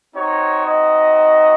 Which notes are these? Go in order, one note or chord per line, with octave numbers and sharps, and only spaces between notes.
C4 D#4 F#4 C#5
D#5